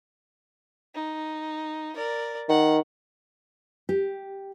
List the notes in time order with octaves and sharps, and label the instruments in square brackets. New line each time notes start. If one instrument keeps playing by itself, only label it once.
[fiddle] D#4
A#4 D5
[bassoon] D#3 [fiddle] F#5
[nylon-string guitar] G4